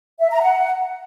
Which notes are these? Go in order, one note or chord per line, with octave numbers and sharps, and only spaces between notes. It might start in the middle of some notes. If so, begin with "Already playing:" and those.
E5
A#5
F#5